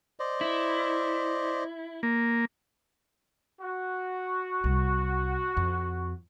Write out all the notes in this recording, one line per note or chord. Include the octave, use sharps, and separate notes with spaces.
C5 D5 D#5
E4
A#3
F#4
C2
F2